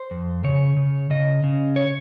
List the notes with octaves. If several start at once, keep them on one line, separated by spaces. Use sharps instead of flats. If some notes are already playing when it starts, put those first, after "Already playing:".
Already playing: C5
F2
C#3 C#5
C#3
C#3 D#5
C#3
C#5